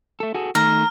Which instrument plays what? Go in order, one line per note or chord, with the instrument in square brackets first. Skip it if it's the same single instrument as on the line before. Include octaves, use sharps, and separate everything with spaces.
[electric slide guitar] A3 A4
F#4 G#4 A4
[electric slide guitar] D#3 A3 [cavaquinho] A#5 [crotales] F6